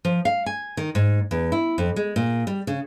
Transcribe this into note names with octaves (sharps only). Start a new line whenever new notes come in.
F3
F5
G#5
D#3
G#2
E2
E4
F2
G#3
A#2
G3
C#3